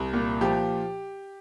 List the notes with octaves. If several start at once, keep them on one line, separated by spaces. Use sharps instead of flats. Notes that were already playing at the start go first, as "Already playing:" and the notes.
Already playing: C2
A#2
F3 G4